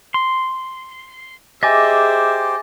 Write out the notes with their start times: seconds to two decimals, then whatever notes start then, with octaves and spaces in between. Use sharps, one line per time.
0.14 C6
1.63 G4 G#4 C5 D#5 E5 G#5 D6 A6